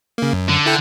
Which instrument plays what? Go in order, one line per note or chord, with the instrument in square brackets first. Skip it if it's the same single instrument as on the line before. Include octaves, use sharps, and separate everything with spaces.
[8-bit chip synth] C#3 A#3
F#2
[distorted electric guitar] D3
[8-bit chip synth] E4 A4 G5